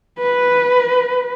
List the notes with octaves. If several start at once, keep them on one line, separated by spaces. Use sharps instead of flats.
B4